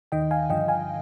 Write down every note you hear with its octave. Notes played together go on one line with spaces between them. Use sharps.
D#2 D#3 D#5 G5
F5 G#5
G2 D3 F3 D#5 G5
F5 G#5